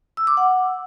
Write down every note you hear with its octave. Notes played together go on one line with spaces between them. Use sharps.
E6
D6
F#5